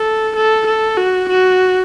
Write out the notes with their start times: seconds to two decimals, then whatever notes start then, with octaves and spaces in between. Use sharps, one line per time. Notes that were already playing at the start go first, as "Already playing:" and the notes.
Already playing: A4
0.36 A4
0.67 A4
0.97 F#4
1.29 F#4